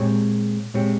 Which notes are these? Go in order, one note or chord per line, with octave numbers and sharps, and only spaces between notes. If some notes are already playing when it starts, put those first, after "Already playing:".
Already playing: A#2 G#3 C4 G4 C#5
A#2 G#3 C4 G4 C#5